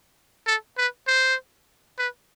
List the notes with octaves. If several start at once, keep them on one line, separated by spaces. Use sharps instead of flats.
A4
B4
C5
B4